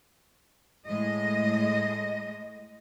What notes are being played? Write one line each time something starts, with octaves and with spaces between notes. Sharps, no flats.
A2 G#3 D#5